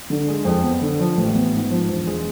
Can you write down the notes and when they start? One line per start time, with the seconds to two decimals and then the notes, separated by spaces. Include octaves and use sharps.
0.10 D3
0.28 G#3
0.45 F2
0.63 B3
0.81 D3
0.99 F3
1.17 A1
1.34 B3
1.53 G#2
1.71 F3
1.88 E1
2.07 G#3